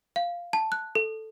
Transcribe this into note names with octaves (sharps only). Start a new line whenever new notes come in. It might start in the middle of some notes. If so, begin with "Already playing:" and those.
F5
A5
F#6
A4